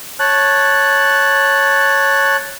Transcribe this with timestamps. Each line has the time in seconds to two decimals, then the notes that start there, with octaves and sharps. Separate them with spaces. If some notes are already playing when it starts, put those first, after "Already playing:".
0.20 C#5 A5 F#6